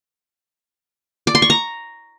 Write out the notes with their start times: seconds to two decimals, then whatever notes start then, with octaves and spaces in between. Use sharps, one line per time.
1.27 D5
1.35 C6
1.42 C#6
1.50 A#5